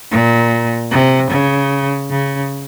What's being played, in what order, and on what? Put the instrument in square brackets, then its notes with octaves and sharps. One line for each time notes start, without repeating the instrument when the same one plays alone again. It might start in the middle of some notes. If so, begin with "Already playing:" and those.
[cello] A#2
C3
C#3
C#3